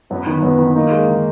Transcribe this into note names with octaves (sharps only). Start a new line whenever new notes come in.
F#2 B3
D#3
F#2 B3
D#3
A#3 D#4
G#3
D#3